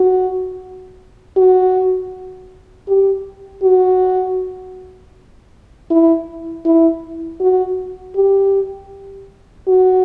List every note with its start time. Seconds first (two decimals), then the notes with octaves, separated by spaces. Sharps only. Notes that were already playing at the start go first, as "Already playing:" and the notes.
Already playing: F#4
1.37 F#4
2.88 G4
3.63 F#4
5.90 E4
6.65 E4
7.41 F#4
8.16 G4
9.68 F#4